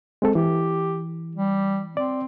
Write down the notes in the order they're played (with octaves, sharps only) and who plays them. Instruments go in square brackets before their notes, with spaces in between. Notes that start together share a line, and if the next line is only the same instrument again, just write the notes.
[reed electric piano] G#3 C4 A4
[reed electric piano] E3 [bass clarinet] G4
[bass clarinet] G3
[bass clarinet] C4 [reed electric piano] D5